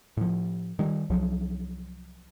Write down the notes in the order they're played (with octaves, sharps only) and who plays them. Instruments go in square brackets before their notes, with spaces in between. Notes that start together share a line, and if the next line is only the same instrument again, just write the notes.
[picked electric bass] A2 F3
D#3 G3
C2 F3 F#3